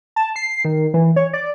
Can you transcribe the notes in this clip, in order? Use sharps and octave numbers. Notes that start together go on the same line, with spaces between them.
A5
C7
D#3
E3
C#5
D5